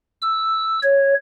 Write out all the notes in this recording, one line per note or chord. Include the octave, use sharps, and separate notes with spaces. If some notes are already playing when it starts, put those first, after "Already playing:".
E6
C#5